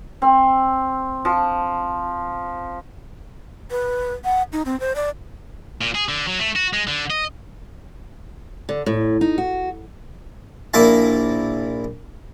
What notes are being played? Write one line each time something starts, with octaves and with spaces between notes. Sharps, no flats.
C4
F3
B4
F#5
D#4
C4
C5
D5
A#2
G#4
D3
F#3
A3
F#4
G#3
D3
D#5
D3
A2
D#4
F#4
A#1 A#3 E4 E5 A5